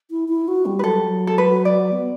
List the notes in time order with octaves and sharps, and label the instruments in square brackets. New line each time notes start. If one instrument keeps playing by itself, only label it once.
[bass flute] E4
E4
F#4
G3
[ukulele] B4
[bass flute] F#3 [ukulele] A4
[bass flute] G3
F#3
[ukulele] A4
B4
D5
[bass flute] B3